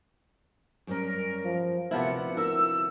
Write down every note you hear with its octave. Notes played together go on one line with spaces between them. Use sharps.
F#2 G3 C#4 A#4
F3
D2 C3 F3 B3 E4 A#4 E5 F#5
E4 A#4 E6